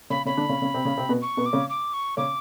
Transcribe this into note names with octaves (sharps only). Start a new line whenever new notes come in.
C#3 C#4 B5
C#3 C#4 B5
D3 D4
C#3 C#4
C#3 C#4
C3 C4
C#3 C#4
C3 C4
B2 B3
C#6
B2 B3
D6
C#3 C#4
D6
C#6
C#3 C#4 D6